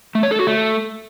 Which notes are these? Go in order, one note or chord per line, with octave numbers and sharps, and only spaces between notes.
A3
C#5
A4
F#4
A3